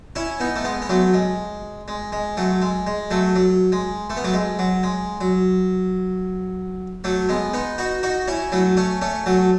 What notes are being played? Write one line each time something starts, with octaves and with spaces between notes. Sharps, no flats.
C#4 E4
B3 D#4
A3
G#3 B3
B3
F#3 A3
G#3
G#3
G#3
F#3 A3
G#3
G#3
F#3 A3
F#3
G#3
A3
B3
F#3 A3
G#3
F#3
G#3
F#3
F#3 A3
G#3 B3
B3 D#4
D#4 F#4
D#4 F#4
C#4 E4
F#3 A3
A3 C#4
A3 C#4
F#3 A3